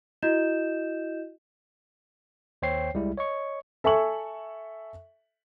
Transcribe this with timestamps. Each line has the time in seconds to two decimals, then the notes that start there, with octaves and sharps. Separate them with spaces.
0.22 E4 F#4 D#5 G6 E7
2.62 D#2 C5 C#5 G5 C7
2.94 C2 G3 G#3 E4
3.18 C#5 D#5 C#6
3.84 A4 E5 G#5 C#6 F#7